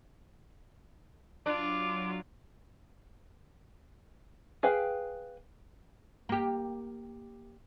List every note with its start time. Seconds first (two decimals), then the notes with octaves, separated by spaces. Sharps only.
1.46 F#3 D4 F4 D6
4.63 G#4 B4 F5 G5
6.29 A#3 G4